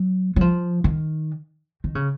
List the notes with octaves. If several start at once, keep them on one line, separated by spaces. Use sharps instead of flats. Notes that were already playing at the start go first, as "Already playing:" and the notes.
Already playing: F#3
F#3
F3
D#3
D#3
C#3